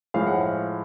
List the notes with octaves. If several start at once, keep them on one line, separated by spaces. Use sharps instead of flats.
A2 F3 G#3 F5
F#5
F5